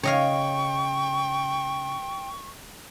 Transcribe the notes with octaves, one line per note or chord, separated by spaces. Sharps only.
C#3 C#5 D#5 F5 G5 C#6